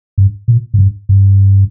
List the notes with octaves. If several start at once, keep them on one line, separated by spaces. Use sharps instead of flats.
G2
A#2
G#2
G2
G2